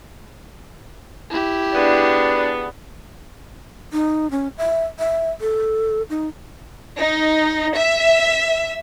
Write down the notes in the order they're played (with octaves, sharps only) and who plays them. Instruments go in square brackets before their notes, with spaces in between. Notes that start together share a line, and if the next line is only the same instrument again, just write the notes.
[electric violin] E4 G4
[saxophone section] B3 G#4 [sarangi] D4
[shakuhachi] D#4
C#4
E5
E5
A4
D#4
[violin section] D#4
E5